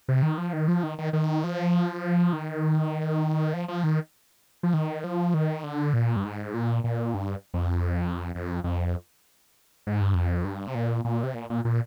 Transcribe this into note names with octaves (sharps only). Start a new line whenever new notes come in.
C3
D#3
F3
D#3
F3
D#3
D#3
D#3
F3
D#3
F3
F3
D#3
F3
D#3
F3
D#3
D3
A#2
G2
G#2
A#2
A#2
G2
F2
F2
F2
G#2
G2
F2
G2
C3
A#2
A#2
C3
A#2
A#2
A#2